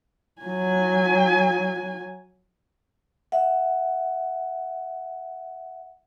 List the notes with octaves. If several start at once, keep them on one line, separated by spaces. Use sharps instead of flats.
F#3 G#5
E5 F#5